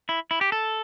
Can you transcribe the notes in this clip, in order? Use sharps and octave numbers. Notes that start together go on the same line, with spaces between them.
E4
E4
G4
A4